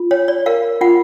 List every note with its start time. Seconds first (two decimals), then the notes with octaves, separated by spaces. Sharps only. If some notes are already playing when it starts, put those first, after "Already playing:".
Already playing: F4
0.11 C#5
0.28 D5
0.46 A#4 F5
0.81 F4 F#5